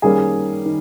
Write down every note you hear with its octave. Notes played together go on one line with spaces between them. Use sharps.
D#3 G3 A#3 C#4 G#4
D#3